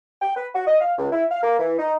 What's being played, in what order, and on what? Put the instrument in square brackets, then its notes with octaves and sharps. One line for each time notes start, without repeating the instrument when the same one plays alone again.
[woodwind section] G5
B4
F#4
D#5
F5
C#2
E4
F5
A#3
E3
D#4